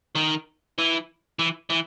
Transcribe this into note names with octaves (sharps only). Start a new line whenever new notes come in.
D#3
E3
E3
E3